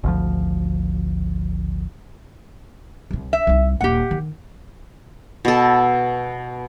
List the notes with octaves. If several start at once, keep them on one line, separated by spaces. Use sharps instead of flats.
G#1 D2 F3
C2 C3
E5
C2 D#4
D#1 A#3 G4 F#5
D#3
B2 A4